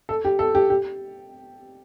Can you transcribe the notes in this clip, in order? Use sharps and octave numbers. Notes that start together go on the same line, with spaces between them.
A4
G4
A4
G4
G4